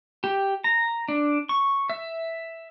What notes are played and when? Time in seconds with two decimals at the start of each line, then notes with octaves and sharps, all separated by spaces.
0.24 G4
0.64 A#5
1.08 D4
1.49 C#6
1.90 E5